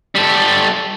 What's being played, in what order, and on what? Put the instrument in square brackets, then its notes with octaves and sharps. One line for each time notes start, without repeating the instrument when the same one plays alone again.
[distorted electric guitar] G3 A4